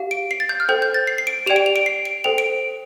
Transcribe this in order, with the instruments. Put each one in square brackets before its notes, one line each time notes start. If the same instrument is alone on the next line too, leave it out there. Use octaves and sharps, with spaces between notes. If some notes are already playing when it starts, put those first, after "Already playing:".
Already playing: [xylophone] G4 F5
D7
C7
A6
G6
F6
A4 C5 G5 G6
G6
A6
C7
C7
D7
G4 D5 G5 F7
D7
F7
D7
C7
D7
A4 C5 G5 F7
D7